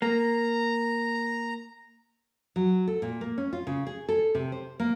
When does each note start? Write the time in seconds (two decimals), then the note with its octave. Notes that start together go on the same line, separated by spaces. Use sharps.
0.02 A#3 A#5
2.56 F#3
2.88 A4
3.02 A#2
3.21 A#3
3.38 C#4
3.53 F4
3.67 C#3
3.87 G#4
4.09 A4
4.35 C3
4.52 C5
4.80 A#3